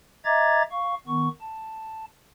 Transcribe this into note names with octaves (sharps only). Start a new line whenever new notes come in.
D#5 E5 A#5 D6 G#6 A6
F5 C#6
D#3 B3 C#6
A5